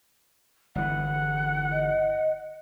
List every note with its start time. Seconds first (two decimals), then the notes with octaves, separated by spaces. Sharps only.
0.75 G1 E3 F#5
1.72 D#5